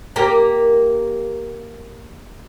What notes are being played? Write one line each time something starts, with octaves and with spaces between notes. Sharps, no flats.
A#3 G4 A#4